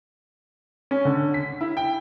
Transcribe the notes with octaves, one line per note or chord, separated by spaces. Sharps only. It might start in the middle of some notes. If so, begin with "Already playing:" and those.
C#4
D3
B6
E4
G5